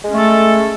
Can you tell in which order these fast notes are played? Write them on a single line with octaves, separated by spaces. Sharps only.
G#3 C#4 A3 A4